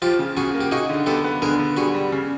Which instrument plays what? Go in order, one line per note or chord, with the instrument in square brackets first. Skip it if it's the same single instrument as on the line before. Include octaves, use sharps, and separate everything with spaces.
[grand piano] F3 [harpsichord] F4 G4
[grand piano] C#3
[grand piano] C#3 [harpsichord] F#4 G#4
[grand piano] A#3
[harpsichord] G4
[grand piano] D#4 [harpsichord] F#4 G#4
[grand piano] D3
[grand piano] B3 [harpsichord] G4 A4
[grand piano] B3
[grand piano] D3 [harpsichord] G#4 A#4
[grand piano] D3
[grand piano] G3 [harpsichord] F#4 G#4
[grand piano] G3
C#3